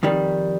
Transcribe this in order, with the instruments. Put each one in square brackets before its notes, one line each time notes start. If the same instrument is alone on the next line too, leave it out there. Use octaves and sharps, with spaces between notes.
[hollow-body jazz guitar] F2 D#3 G3